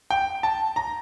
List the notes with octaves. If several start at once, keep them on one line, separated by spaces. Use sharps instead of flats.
G5
A5
A#5